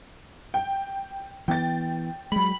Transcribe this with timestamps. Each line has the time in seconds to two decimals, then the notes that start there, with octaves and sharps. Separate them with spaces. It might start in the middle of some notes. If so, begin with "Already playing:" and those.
0.54 G5
1.48 E3 B3 G5 A6
2.32 F#3 G#3 B5